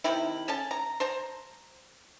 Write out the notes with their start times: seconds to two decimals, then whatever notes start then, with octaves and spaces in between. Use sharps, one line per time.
0.04 C3 D#3 E4
0.48 C#4 A4 A5
0.71 A#5
1.00 C5 A5 A#5